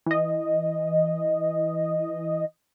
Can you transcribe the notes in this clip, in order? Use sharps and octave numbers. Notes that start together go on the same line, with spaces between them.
E3 D#5